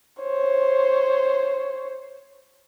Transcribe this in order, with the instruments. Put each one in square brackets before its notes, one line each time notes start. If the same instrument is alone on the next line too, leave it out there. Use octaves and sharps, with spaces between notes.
[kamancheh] C5 C#5